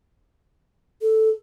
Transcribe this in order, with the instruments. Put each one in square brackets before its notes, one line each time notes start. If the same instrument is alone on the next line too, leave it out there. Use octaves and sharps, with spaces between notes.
[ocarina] A4